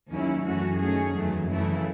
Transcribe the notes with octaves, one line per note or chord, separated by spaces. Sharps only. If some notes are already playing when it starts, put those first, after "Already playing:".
D#2 D#3 F#3 C#4 E4
F#2 E3 A3 C#4 F#4
D#3 A3 C#4 G#4
E2 D#3 F#3 A3
F#2 C#3 E3 A3 E4